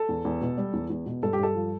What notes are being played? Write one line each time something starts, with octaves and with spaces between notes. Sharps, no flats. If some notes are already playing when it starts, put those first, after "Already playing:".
Already playing: A4
E2
E2
B2
G3
E2
E2
B2
G2 A4
G4
G2 A4
F3